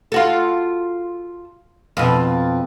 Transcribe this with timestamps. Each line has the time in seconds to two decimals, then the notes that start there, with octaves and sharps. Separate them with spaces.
0.12 F4 F#4 A4
1.97 F2 B2